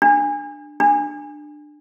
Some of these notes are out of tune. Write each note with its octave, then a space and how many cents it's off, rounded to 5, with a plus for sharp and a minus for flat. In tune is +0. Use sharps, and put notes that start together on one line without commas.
D4 +15
D4 +20